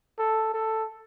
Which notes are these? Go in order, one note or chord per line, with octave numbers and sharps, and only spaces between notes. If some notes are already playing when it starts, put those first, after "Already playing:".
A4
A4